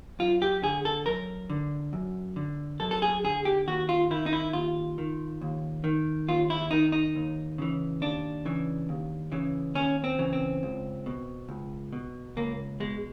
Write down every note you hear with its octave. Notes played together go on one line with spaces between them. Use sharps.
F#2 F4
G4
D3 G#4
A4
F#2 A#4
D3
F#2
D3
F#2 A4
A4
G#4
D3 G#4
G4
D#2 F#4
F4
D#3 E4
D#4
E4
D#2 F4
D#3
D#2
D#3
D#2 F4
E4
D#3 D#4
D#4
D#2
C#3 E3
D#2 D4
C#3 E3
D#2
C#3 E3
D#2 C#4
C4
C#3 E3
C4
C#2
B2
C#2
B2
C#2 A#3
B2 G#3